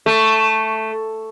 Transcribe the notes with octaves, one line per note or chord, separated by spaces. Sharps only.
A3